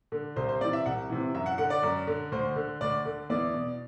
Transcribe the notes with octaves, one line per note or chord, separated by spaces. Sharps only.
D3
C2 C5
C5
C3 E3 D5
E5
C2 F#5
C3 E3
F#2 E5
F#5
D3 F#5
D5
F#2
D3
D2 C5
D3
D2 D5
D3
E2 D5
B2